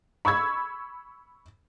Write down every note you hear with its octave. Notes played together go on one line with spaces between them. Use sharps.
B5 C#6 E6 G#6